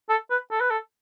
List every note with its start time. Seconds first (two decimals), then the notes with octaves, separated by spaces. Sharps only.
0.09 A4
0.30 B4
0.51 A4
0.60 B4
0.70 A4